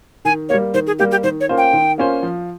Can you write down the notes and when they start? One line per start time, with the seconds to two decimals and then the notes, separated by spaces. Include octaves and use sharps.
0.25 D#3 G#5
0.49 G3 A#3 C#5
0.74 D#3 C5
0.87 G#4
0.99 G3 A#3 G4
1.11 G4
1.23 D#3 C5
1.40 C#5
1.49 A#3 C#4 F4 C5
1.58 G5
1.73 D#3
1.98 A#3 C#4 F4 C5
2.23 F3